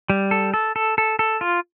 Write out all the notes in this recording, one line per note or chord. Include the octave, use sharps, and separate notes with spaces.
G3
A4
A4
A4
A4
A4
F4